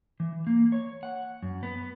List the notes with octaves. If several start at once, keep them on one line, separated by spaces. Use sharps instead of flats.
E3
A#3
C#5
F#5
F#2
B3